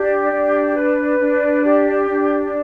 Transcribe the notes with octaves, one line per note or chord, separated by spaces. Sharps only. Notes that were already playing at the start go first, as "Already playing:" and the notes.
Already playing: D4 G4
D4
B4
D4
G4
D4